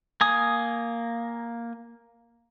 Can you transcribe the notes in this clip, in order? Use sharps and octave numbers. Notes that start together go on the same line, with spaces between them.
A#3 G#5 D#6